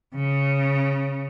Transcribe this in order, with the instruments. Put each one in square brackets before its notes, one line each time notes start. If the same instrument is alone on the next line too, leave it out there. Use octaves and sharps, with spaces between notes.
[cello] C#3